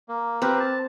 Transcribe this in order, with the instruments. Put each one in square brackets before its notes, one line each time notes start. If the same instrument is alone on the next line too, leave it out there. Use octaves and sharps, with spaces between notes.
[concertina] A#3
[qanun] C4 [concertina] G4 A#4 B4
[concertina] A5